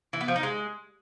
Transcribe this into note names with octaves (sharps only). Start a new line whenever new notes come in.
E3
B3
F3
D#4
G#3